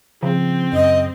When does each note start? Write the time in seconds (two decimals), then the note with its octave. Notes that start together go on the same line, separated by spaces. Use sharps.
0.23 C#3 F3 C4
0.73 F#2 D#5